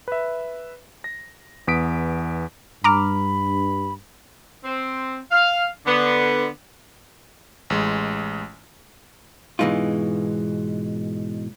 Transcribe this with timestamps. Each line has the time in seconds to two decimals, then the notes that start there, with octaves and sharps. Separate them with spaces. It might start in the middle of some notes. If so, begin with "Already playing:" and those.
0.08 B4 E5
1.04 A#6
1.67 E2 B3 D#6 B6 D7
2.84 G2 A#5 B5 D6 F6
4.64 C4
5.31 F5
5.86 D3 B3
7.70 A1 G#3
9.59 G#2 B2 E3 G#3 D#4 F4